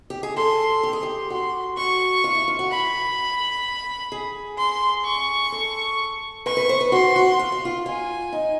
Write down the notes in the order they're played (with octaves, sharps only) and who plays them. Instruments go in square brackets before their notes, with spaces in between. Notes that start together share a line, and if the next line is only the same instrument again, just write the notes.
[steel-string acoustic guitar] G4
G#4
[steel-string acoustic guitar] A4 [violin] C6
[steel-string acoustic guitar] G4
G#4
G4
[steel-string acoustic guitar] F#4 [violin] C6
[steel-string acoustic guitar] F#4 [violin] C#6
[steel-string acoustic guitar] F4
E4
F4
F#4
[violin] B5
[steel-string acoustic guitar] G#4
[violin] C6
C#6
[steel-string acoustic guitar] A4
[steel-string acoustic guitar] B4 [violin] C#6
[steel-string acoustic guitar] B4
C5
B4
[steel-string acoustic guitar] F#4 [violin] C6
[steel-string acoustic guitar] F#4
F4
F#4
F4
[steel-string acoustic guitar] F4 [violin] G#5
[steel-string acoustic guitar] D#4